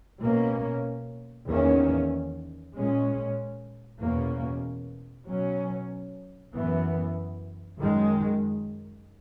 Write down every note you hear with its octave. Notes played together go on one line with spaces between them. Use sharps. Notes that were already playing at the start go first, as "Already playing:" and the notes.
B2 A#3 C#4
E2 D#3 A#3 C#4
A#2 G#3 C#4
E2 B2 A#3 C#4
B2 F#3 C#4
F#2 E3 B3
F#2 D#3 G#3